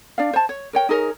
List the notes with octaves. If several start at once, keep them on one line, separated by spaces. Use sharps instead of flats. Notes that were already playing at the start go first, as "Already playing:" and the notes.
D4 D5 F5
C5 A5
C#5
A#4 C#5 G5
D#4 G#4 A#4 C#5